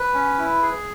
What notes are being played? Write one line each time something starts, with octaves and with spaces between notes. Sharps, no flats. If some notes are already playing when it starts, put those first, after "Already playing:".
Already playing: B4
C#4
E4
G#4